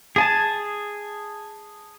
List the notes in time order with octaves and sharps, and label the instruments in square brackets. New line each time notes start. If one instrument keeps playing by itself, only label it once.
[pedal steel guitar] G#4 G#5 A5